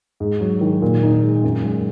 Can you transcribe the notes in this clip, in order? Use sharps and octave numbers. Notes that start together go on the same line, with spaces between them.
G#2
F#3
D#3
A#2
D#4
G#3
F#2
G#3